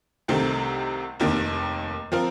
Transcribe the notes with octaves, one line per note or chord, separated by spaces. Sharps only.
C2 C3 D#3 A3 C4
F1 D#2 D#3
F3 C4 F4 A#4